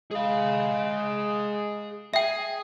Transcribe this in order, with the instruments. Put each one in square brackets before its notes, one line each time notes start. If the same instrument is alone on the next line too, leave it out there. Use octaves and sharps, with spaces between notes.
[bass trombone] G#3 [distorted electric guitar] G#4 F5
[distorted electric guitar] G#4 [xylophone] E5 G5